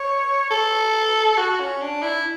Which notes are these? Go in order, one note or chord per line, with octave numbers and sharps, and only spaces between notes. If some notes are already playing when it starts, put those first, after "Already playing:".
Already playing: C#5
A4
F#4
C#4
D4
E4